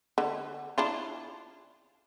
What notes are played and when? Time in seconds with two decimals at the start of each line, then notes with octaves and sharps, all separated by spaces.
0.18 D3
0.78 D4 E4 F4